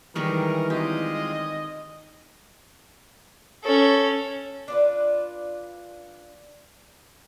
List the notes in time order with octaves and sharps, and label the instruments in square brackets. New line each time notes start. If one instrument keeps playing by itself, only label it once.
[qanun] D#3 G3 G#3 [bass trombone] E3 [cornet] A#4 [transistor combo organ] C#6 D#6 F6
[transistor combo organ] G#3 C4 F4 [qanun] G4 [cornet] D#5
[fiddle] C#4 A4
[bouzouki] D4 F4 B4